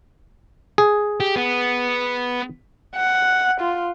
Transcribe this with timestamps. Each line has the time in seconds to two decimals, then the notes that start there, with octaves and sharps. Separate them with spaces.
0.78 G#4
1.20 G4
1.36 B3
2.96 F#5
3.61 F4